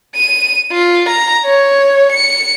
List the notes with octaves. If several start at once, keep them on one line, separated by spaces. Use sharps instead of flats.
D#7
F4
A#5
C#5
C#7